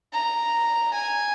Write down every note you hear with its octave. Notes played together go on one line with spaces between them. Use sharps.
A#5
G#5